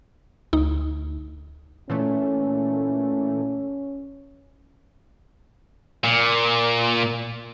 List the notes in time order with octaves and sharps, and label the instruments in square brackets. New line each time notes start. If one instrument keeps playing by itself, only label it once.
[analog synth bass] D2 [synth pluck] D#4
[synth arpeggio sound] A#2 E3 A3 [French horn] C#4
[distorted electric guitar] A#2